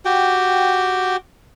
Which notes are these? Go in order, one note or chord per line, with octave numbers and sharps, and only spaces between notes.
F#4 G4 G5